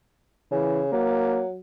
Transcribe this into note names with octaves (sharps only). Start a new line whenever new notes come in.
C#3 E3
F#3 A#3